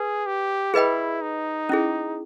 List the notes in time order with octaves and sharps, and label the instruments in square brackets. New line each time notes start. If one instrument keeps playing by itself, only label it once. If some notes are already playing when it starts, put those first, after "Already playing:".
Already playing: [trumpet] G#4 [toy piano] B4
[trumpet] G4
[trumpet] E4 [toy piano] G#4 B4 D#5 G5 B5
[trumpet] D#4
[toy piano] C#4 E4 G#4